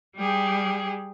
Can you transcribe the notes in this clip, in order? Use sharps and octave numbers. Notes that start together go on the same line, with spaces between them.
G3 G4 G#4